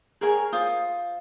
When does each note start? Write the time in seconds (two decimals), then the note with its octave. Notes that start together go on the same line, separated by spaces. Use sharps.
0.21 G#4 A#4 C#5 G#5
0.53 F4 C5 D#6